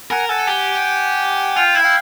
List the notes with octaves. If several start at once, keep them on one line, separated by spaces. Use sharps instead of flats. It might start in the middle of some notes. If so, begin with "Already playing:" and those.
A#4 F#5 G#5
A4 F#5 G#5
G4
F4 F5 G5
E4
F5 G5